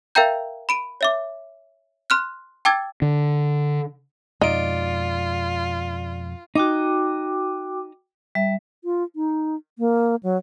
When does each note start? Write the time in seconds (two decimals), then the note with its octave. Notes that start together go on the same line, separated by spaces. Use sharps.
0.15 A#4 E5 F5 G5 A#5 G6
0.69 B5 D7 D#7
1.01 C#5 E5 D6
2.10 C6 F6 F#6
2.65 G5 A5 D6 E6 G#6 A6
3.02 D3
4.41 F2 B2 G#3 D#4 F4 D5 D7
6.55 D#4 F#4 G5 D6
8.35 G3 E5
8.84 F4
9.16 D#4
9.79 A#3
10.23 F#3